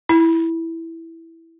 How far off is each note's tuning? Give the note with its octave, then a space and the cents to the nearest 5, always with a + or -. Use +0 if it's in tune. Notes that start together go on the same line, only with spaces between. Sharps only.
E4 +0